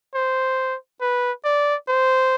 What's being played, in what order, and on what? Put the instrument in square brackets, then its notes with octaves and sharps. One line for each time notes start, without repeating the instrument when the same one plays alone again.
[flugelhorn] C5
B4
D5
C5